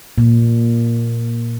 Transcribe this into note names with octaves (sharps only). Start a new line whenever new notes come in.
A#2